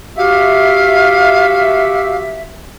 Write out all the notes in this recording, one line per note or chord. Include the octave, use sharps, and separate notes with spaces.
F#4 G4 E5 F5